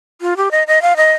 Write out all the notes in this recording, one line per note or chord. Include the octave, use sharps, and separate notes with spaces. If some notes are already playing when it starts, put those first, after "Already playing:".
F4
G4
D#5
D#5
F5
D#5